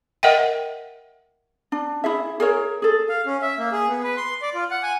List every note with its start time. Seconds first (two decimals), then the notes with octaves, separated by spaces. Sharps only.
0.23 A#4 D#5 E5 F#5 G5
1.72 D4
2.04 E4 G#4 E5
2.40 G#4 A#4 C#5
2.82 G#4 A4
3.09 F5
3.26 C#4
3.42 E5
3.59 A#3
3.72 G#4
3.88 B3
4.04 B4
4.17 C6
4.42 D5
4.54 F4
4.71 F#5
4.83 G#5